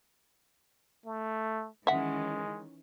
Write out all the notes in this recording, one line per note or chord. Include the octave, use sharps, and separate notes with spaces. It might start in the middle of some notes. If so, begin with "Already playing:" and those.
A3
D#3 E3 G#3 C#4 E5 F#5